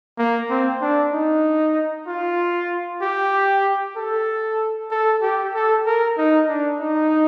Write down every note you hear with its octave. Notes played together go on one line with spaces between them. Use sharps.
A#3
C4
D4
D#4
F4
G4
A4
A4
G4
A4
A#4
D#4
D4
D#4